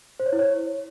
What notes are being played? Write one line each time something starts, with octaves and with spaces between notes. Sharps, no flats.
C5
C#5
E4
C#5